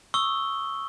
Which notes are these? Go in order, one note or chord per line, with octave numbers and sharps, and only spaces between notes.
C#6 D#6 E6 G7